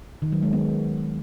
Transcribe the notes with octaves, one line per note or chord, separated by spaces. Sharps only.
D#3
F#3
G#3
B3